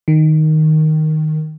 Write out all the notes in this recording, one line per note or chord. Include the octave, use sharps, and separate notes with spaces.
D#3